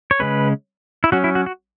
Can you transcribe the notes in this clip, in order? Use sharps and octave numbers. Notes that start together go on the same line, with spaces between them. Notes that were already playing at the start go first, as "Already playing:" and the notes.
C#5
C#3 G#3 C#4 B4
E4
F#3 C#4 F#4
E4
F#4
F#4